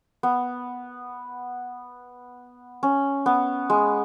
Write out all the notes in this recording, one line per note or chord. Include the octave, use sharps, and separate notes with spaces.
B3
C#4
B3
G#3